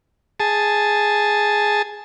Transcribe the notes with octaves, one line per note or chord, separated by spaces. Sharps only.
G#4 A5